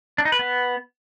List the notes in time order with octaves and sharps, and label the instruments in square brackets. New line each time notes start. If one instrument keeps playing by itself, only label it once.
[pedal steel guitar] D4
D#4
B4
B3